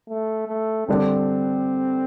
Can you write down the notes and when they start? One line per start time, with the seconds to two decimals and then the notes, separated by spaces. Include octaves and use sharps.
0.09 A3
0.48 A3
0.88 D3 G3 C4 D4 A4